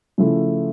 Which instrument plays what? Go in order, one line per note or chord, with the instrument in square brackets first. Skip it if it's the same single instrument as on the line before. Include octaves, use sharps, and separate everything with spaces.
[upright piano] C#3 F3 A3 E4